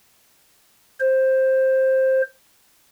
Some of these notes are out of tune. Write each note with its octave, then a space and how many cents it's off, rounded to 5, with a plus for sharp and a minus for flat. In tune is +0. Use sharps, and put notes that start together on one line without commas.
C5 +10